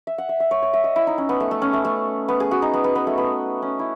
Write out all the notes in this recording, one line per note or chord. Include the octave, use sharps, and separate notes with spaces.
E5
F#5
E5
E5
C#5
C#5
E5
D#5
E4
D#4
C#4
B3
A3
A3
C#4
A3
A3
B3
G#4
F#4
D#4
B3
B3
B3
A3
B3
C#4
E4